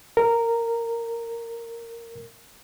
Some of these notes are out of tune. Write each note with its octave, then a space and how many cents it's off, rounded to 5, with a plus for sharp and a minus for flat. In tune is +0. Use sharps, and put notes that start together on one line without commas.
A#4 -10